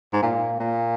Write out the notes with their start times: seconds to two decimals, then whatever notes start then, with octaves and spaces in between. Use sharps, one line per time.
0.13 G#2
0.22 A#2
0.60 A#2